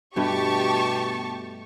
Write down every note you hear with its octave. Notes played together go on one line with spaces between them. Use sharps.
G2 B2 A3 G4 A5 C#6